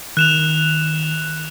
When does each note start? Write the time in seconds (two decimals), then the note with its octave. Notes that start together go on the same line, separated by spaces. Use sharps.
0.17 D#3 F#6 E7 F7